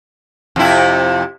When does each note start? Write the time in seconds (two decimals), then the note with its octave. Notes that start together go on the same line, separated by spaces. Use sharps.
0.56 F2 C3 E4